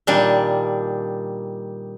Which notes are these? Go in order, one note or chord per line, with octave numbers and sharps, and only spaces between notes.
A#2 D#3 G3 D4